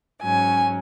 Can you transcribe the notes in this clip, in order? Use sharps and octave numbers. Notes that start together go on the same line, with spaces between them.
G#2 F#3 C#4 G#5